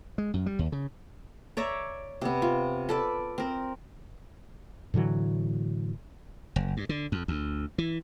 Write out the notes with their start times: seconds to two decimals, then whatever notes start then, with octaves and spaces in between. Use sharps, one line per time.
0.18 G#3
0.34 F#2
0.46 G3
0.59 D#2
0.72 C#3
1.57 C#5 D5 E5 A#5
2.21 C3 B3
2.42 F4
2.89 A4 B4 D5
3.38 C4 A#4
4.94 A2 D3 E3 F#3
6.56 F#1
6.77 G2
6.89 D3
7.12 F2
7.28 D2
7.78 E3